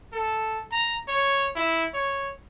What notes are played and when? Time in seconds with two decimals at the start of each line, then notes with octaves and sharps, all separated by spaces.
0.13 A4
0.72 A#5
1.08 C#5
1.56 E4
1.94 C#5